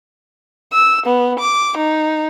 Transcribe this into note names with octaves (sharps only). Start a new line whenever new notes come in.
E6
B3
D6
D#4